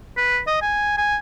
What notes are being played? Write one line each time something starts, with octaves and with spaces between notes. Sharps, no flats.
B4
D#5
G#5
G#5